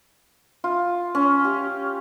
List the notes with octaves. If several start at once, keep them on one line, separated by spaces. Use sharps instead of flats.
F4
C#4
G4